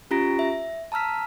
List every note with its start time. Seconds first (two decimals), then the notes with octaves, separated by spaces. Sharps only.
0.11 C#4 F4 G4 A#5 A#6 D7
0.39 E5
0.92 A5 A#5 E6 F6 B6